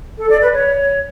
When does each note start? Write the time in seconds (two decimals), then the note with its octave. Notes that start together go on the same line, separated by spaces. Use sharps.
0.18 A4
0.30 D5
0.41 B4
0.53 C#5